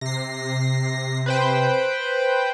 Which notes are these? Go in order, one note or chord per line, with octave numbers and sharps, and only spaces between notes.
C3 A#6 C7
B4 C5 G5